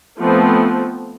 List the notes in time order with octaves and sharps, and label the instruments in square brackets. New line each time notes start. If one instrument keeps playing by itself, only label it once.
[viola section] F3 A3 B3 C4